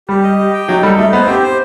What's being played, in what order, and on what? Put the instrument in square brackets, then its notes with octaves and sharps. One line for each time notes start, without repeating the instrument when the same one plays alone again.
[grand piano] G3 [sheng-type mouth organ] G4
[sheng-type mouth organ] D#5
G4
G5
[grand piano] F#3 [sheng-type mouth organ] D#4
[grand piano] G3 [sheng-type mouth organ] A4
[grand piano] A3 [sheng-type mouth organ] D#4
[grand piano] B3 [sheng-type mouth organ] C5
[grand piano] C4 [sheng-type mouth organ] G4
[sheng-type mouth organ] C5